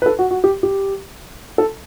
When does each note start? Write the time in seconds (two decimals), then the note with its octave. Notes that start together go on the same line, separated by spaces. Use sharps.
0.02 B4
0.06 A4
0.19 F#4
0.31 F#4
0.44 G4
0.63 G4
1.58 A4